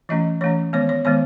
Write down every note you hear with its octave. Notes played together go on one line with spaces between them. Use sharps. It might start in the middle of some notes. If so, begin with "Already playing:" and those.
E3 A3 C#4 D#5
E3 A3 C#4 C#5
D#3 G#3 B3 C#5
C#5
D#3 G#3 B3 C#5